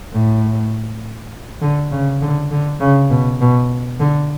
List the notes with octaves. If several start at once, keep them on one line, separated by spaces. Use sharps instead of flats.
A2
D3
C#3
D3
D3
C#3
B2
B2
D3